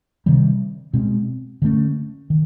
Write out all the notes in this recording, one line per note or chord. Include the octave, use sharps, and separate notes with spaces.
C3 D#3 G3
B2 G#3 C4
D3 F3 A3 C#4
D#3